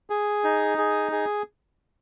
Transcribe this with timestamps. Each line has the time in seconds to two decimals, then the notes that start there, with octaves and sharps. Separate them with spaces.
0.10 G#4
0.44 D#4
0.78 G#4
1.12 G#4